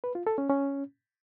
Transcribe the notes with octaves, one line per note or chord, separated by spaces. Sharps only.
B4
F4
A4
C#4
C#4